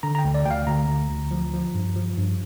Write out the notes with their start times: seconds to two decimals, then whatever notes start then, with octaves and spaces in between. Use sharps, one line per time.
0.03 D3 A#5
0.15 A#5
0.19 G5
0.24 D2
0.34 D5
0.45 D2 G5
0.51 F5
0.67 D2 A#5
0.89 D2
1.10 D2
1.31 F3
1.53 F3
1.75 G2
1.96 F3
2.17 G2